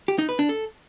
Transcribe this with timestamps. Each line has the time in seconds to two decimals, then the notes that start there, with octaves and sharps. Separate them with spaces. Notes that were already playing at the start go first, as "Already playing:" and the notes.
0.08 G4
0.18 D#4
0.29 B4
0.39 D4
0.49 A4